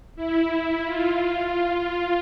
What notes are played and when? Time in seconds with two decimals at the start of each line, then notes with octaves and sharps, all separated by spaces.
0.16 E4
0.85 F4
1.54 F4
1.89 F4